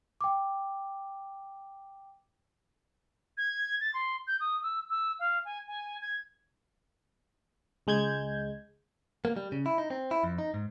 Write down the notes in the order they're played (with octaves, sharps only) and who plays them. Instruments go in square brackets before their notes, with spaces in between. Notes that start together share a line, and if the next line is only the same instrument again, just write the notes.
[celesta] G5 D6
[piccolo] G#6
A6
C6
G6
D#6
E6
E6
F5
G#5
G#5
G#6
[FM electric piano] C#2 G#3 G6 G#6
[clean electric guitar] A#3
G3
C#3
E4
D#4
C4
E4
F2
D#4
G#2